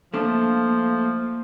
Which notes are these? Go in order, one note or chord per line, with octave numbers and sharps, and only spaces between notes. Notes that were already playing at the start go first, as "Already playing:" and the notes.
F3 A3 A#3 D4